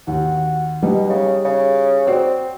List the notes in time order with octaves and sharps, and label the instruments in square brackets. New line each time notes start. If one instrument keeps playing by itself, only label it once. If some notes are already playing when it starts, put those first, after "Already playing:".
[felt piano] D#2 [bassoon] F#4
[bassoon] B2 [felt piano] G3 D#4
[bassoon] C#3
C#3
[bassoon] C4 [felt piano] F#4 C5 D5